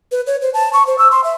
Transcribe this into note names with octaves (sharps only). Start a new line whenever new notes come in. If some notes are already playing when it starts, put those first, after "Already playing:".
B4
C#5
C5
A5
C#6
C5
E6
C6
E5